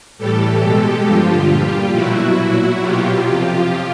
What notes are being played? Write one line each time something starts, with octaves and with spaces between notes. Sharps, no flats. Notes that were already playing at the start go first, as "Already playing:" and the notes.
A2 E3 G3 G4 A4
B2 G#3
G2 D3 F3 F4 G4
A#2 G3
B2 F#3 E4 F#4
A#2 F#3
B2 F#3 F4 G4
F2 C3 F3